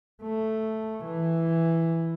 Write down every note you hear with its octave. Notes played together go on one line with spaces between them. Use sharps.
A3
E3